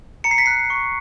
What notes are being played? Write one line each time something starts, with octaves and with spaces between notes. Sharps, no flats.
A#5 C#7
C7
B6
F#6 C7
C#6